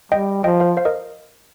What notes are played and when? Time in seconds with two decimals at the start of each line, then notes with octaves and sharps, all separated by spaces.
0.12 G3 D#5 G5
0.44 F3 D#5 G5
0.60 C5 F5
0.77 C5 F5
0.85 A#4 D#5